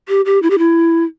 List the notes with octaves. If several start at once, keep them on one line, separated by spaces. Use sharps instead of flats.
G4
G4
E4
G4
E4